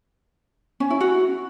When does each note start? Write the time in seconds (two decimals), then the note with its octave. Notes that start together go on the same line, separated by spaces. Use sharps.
0.80 C#4
0.90 E4
1.00 F#4